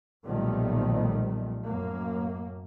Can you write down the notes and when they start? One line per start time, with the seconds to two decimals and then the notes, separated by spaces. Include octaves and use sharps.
0.25 B1 A#2 D#3 F3 G3 A3
1.62 F#2 A2 A#3